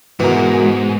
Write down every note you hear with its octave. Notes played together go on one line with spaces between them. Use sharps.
G#2 B2 E3 F#4 A#4